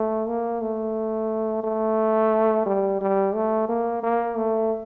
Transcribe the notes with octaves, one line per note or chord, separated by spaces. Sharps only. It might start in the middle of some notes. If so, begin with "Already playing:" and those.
Already playing: A3
A#3
A3
A3
G3
G3
A3
A#3
A#3
A3